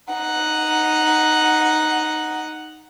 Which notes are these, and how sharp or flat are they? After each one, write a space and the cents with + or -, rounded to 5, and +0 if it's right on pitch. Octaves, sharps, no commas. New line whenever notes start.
D#4 +0 F#5 +0